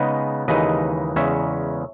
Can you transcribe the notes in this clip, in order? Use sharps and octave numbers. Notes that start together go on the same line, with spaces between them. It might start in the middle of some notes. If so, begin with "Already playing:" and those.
Already playing: C#3 G#3 B3 D#4 B4 D#5
D#2 C#3 E3 G#3 D#4 B4 D#5
E2 C#3 G#3 C#4 C#5 E5